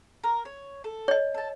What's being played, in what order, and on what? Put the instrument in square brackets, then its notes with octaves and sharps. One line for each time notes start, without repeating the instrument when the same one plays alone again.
[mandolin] A#4
C#5
A4
[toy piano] C#5 D#5
[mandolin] A4 A5